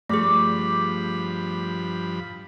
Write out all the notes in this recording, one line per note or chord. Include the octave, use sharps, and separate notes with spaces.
G2 F3 A3 G#4 B5 D6